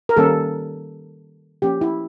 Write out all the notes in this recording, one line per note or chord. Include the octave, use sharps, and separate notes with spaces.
A#4
D#3 G3 A#3 C#4 A4
F3 A#3 C#4 G4
E4